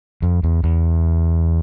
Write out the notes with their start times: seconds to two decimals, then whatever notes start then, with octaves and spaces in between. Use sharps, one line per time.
0.22 F2
0.43 E2
0.64 E2